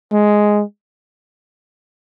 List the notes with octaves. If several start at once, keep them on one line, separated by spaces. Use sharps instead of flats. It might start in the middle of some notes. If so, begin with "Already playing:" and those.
G#3